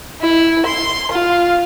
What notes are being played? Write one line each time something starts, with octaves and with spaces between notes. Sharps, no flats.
E4
C6
F4